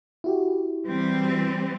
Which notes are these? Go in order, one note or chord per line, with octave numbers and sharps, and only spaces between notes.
E4 F#4 G4
E3 G3 C4